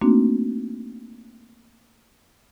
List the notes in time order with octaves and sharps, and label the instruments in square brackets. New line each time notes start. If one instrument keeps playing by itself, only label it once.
[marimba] A3 A#3 C4 D4 D#4 F#4